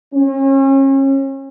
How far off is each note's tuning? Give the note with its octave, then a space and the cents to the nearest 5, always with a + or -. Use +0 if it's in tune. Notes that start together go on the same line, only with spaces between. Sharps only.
C#4 -35